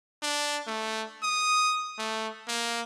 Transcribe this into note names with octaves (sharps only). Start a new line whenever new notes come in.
D4
A3
D#6
A3
A#3